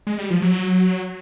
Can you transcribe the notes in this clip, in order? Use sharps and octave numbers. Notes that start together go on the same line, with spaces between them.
G#3
G3
F3
F#3